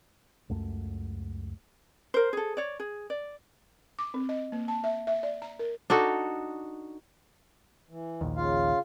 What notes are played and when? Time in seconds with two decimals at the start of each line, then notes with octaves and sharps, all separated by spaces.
0.49 C#2 F#2 A3
2.14 A#4 C5
2.33 G#4 A4
2.57 C#5 D5
2.80 G#4
3.10 D5
3.99 D6
4.14 C4
4.29 D#5
4.52 A#3
4.68 A5
4.84 E5
5.07 E5
5.23 D5
5.42 A#5
5.59 A#4
5.90 D4 D#4 F#4 A4
7.89 E3
8.21 A#1 D#2
8.36 C#3 F4 F5